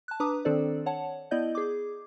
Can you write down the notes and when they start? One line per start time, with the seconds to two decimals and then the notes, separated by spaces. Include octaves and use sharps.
0.08 A5 F#6
0.20 D4 B4 A#5 D6 D#6
0.45 D#3 C4 D4 A4 C5 D5
0.86 C#5 F#5 A5
1.31 B3 E4 D5 D#5 G6
1.55 G#4 D6